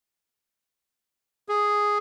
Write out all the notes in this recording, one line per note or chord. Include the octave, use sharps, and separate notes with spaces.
G#4